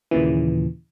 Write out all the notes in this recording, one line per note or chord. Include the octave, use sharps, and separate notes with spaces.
D#2 A#2 C#3 E3